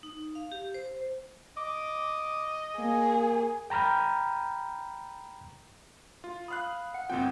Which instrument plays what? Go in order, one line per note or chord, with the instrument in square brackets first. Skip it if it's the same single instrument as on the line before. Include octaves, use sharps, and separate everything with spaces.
[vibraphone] D#4
F5
G4
C5
[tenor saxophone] D#5 [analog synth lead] D6
[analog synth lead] A#3 [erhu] G#4
[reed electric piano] G5 A#5 B5 F6 G6
[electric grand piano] F4
[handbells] F5 B5 [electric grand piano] D#6 F6 F#6
[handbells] F#5
[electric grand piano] G1 C2 G5 [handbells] C4 F4